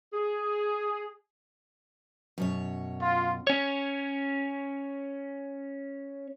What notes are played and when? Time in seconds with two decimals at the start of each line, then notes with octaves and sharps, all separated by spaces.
0.13 G#4
2.38 F#2 B2 C#5
3.02 F4
3.47 C#4 C#5